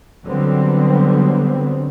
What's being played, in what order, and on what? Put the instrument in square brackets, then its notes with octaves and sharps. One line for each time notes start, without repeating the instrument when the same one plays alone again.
[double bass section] D3 F#3 G3 B3 C4